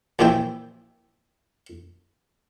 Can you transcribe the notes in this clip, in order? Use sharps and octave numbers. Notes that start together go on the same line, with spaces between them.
A#1 F#2 E3 E4 G5